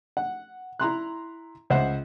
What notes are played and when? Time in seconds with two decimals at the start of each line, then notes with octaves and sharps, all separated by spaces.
0.17 F#5
0.80 E4 A#5 C6 F#6
1.70 C#2 C5 E5 F#5